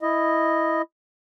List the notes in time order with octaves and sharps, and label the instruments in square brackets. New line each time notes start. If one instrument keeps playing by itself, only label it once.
[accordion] E4 D#5